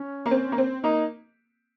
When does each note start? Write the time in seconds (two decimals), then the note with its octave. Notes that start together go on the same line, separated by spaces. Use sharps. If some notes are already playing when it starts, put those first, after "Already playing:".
Already playing: C#4
0.26 A#3
0.31 C4
0.52 A#3
0.58 C4
0.84 A#3 D#4